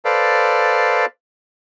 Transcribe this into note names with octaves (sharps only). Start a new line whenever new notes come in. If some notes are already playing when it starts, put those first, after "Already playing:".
A4 B4 C5 D5 F5